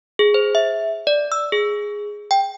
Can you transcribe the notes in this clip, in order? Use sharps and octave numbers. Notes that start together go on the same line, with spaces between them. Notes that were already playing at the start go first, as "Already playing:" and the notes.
G#4
C5
E5
D5
E6
G#4
G5